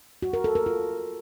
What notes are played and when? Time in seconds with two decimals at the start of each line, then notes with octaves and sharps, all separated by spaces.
0.22 F#4
0.33 A#4
0.44 A4
0.55 A#4
0.66 F4